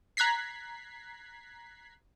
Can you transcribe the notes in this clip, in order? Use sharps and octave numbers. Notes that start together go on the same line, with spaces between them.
A#5 F#6 G#6 B6 C7